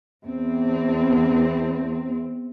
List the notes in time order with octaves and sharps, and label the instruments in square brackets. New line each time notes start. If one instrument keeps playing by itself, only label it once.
[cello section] E2 C4